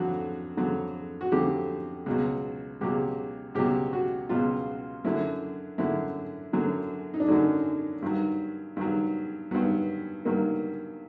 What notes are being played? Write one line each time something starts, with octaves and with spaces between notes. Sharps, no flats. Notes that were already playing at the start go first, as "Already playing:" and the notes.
Already playing: F2 D3 F#3 F#4
F2 D3 F#3
F#4
F2 D3 F#3 G4
C#2 B2 F#3
C#2 B2 F#3 G4
C#2 B2 F#3 G4
F#4
C#2 B2 F#3 F4
F#2 D3 F#3 E4
F#2 D3 F#3 E4
F#2 D3 F#3
D#4
D4
F#2 D3 F#3 C#4
G2 D#3 F#3
G2 D#3 F#3
G2 D#3 F#3 B3
G2 D#3 F#3 A#3